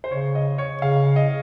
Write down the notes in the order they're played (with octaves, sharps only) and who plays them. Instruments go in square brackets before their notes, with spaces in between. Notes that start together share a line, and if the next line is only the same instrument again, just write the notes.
[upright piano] C5
[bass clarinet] C#3 [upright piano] C#5
[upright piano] D#5
C#5
[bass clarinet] C#3 [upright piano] F5
[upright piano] D#5